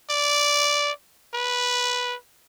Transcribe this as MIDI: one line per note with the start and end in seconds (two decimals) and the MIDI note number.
0.10 0.92 74
1.34 2.16 71